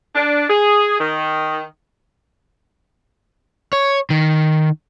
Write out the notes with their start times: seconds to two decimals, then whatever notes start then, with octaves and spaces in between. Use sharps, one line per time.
0.15 D4
0.49 G#4
0.99 D#3
3.73 C#5
4.10 D#3